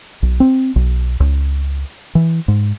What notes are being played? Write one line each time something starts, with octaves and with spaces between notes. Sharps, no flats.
B1
C4
B1
C#2
E3
G#2